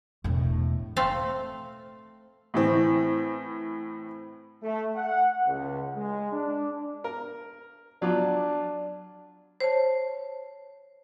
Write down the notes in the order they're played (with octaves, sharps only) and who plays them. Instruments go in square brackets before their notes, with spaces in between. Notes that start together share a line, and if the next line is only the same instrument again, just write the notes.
[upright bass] E1 A2
[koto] A3 C4 A4 F5
[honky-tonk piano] A2 E3 C4
[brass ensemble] A3
F#5
C#2
G#3
D4
[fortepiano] A#4
[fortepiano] F#3 F4 D5 [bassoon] D4
[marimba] C5 C#5 A5